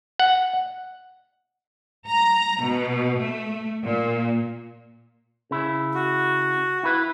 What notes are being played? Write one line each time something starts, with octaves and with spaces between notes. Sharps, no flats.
F#5
A#5
B2
A3
A#2
C#3 E4
F#4
E4 B4